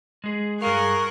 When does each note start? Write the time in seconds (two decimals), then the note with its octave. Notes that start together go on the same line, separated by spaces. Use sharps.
0.24 G#3 G#4
0.62 G2 G#4 A#4 F5 C#6 F#6